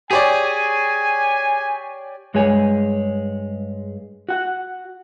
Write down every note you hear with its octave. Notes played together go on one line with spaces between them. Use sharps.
G4 G#4 C#5 D5 G#5
G2 G#3 G#4 C#5 G#5
F#4 F#5